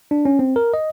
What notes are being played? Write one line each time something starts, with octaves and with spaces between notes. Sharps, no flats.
D4
C#4
C4
A#4
D#5